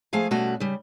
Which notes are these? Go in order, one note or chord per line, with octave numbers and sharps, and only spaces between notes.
F3 A3 G#4 F5 G#5
B2 G3 A3 C#4 F#4
C#3 G3